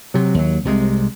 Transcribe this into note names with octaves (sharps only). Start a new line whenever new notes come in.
C3 F#3
D#2 F#3
C2 C3 G#3